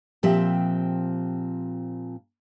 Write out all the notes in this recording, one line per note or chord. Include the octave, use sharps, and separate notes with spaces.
A#2 F3 C4 G4 E5